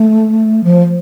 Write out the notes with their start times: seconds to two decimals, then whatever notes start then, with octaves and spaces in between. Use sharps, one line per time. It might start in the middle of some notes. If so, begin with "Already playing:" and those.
Already playing: A3
0.64 F3